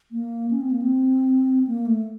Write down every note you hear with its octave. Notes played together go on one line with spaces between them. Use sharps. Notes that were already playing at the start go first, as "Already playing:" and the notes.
A#3
C#4
C4
A#3
C4
A#3
A3